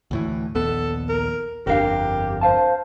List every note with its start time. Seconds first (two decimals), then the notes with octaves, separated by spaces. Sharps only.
0.11 D2 A2 E3
0.55 A#1 D#2 B3 A4
1.09 A#4
1.67 G1 F2 D4 G4 A#4 F5
2.41 C5 F5 A5